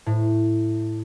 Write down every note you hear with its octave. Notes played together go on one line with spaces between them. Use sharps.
A2